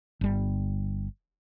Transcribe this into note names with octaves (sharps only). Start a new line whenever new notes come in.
G1 G3